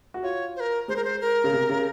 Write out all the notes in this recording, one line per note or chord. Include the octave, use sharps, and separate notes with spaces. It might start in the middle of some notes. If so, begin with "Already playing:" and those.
F#4
F4 C#5
C5
A#4
G#3 C5
A#4
C5
A#4
C#3
C3
C#3